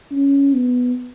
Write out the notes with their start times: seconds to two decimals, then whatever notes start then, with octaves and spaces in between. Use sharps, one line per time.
0.12 C#4
0.54 B3